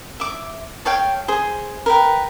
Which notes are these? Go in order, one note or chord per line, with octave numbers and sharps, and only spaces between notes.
E5 D6
A4 C#5 F5 G5
G#4 C5
A#4 B4 G5